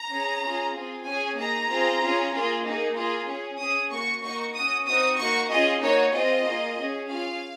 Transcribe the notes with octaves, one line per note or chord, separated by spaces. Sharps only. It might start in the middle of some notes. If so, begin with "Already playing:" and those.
Already playing: A#5
C#4 G#4
C#4 F4 G#4
C4 F4 G#4
C#4 G#4 G#5
A#3 D#4 G#4 A#5
C4 F4 G#4
C#4 F4 G#4
A#3 F4 G#4
A#3 D#4 G#4
A#3 F4 G#4
C#4 G#4
C#4 G#4 D#6
A#3 C#4 F#4 C#6
A#3 D#4 F#4 C#6
C#4 F#4 D#6
C4 D#4 F#4 D#6
A#3 D#4 F#4 C#6
C#4 F4 G#4 D#5
A#3 D#4 F#4 C#5
C4 F4 G#4 D#5
A#3 F4 G#4
C#4 G#4
C#4 F4 G#4 F5